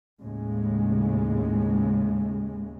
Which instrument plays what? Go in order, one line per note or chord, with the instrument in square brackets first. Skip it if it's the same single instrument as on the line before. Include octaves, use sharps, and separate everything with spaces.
[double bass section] D#2 A2 C#3 G#3